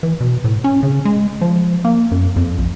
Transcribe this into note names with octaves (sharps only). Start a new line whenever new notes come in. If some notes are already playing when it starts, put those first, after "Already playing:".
E3
B2
A2
C#4
C#3
G#3
F3
A#3
F#2
F2
A#1